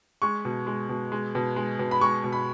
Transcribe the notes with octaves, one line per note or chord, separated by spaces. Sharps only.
G#3 C#6
B2
G#3
B2
G#3
B2
G#3
B2
B5
G#3 C#6
B2
B5